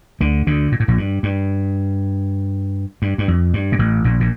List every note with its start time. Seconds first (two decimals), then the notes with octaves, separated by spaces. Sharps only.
0.21 D2 D3
0.47 D2 D3
0.72 A#2
0.80 A2
0.88 A#1 A#2
0.98 G2
1.23 G2
3.02 G2
3.18 G2
3.28 F2
3.53 G2
3.72 A#2
3.79 A1 A2
4.04 A#1 A#2
4.20 A#2